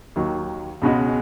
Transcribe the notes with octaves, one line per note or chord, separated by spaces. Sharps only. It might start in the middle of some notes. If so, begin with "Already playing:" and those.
D#2 D#3 F#3
C#2 B2 G#3 C#4 F#4